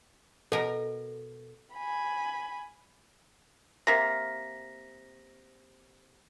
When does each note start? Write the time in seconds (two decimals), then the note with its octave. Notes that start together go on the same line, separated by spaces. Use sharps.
0.52 B2 A4 A#4
1.73 G#5 B5
3.87 C3 A#3 A#6 B6